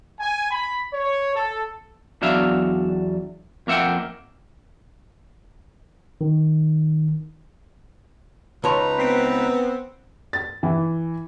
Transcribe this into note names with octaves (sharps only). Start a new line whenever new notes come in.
G#5
B5
C#5
A4
E2 F#3 D4 E5 F5
F2 A#3 E5 F#5 G5
D#3
C#2 D#4 B4 C#5 A5 A#5 C6 F7
B3 C4 B6 C7 D7
A6
E3